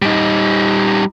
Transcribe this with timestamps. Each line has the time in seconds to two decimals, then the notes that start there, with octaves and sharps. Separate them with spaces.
0.02 G3 D#4